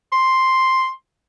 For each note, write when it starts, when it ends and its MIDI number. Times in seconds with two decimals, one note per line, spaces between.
0.12 0.90 84